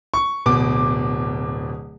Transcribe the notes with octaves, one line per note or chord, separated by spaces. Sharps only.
C#6
D1 B2 D6